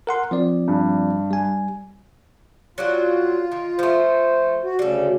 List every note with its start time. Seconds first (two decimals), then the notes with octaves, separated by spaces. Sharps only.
0.07 A#4 F#5 C6
0.31 F3 C4 D5
0.68 G2
1.31 G3 G#5
2.78 F#3 G3 F4 F#4
3.52 D#3
3.79 F3 A3 C5
4.63 F#4
4.79 D2 C#3 G3 A4